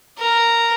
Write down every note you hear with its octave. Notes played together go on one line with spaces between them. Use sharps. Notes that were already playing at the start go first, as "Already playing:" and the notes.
A#4